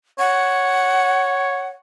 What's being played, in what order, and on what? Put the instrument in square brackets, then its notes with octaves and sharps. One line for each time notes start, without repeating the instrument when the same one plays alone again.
[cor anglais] C#5 [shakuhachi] F#5